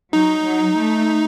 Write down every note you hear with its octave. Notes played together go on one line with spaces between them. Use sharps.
F#3 D#4
F#3
A3